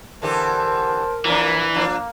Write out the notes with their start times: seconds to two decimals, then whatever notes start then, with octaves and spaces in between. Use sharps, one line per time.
0.22 D3 E3 G4 A#4 C5 A5
1.25 E3 F3 A#3 D4
1.74 F3 A#3 D4